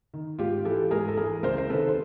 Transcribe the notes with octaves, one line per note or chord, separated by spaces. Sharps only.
D#3
G#2 F4 G4
E3 G4 A4
G#2 G#4 A#4
A4
E3 G#4 A#4
C#2 A#4 C5
C5
C3 D#3 A4 B4
C5